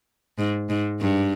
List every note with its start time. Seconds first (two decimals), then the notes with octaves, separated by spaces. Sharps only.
0.39 G#2
0.70 G#2
1.01 G2